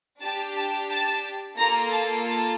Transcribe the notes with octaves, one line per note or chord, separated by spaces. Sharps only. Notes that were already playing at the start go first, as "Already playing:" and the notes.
D4 G4 A5
A5
A5
A#3 F4 A4 A#5
A5
A5